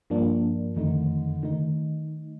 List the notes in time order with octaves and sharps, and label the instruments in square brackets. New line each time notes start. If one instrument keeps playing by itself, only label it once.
[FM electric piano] G2 F3 A#3 D4
[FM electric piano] F2 D#3 A3 D#4 [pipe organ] D3
[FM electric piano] D#3 A3 D#4